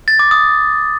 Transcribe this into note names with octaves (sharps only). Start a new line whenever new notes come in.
A6
D6
D#6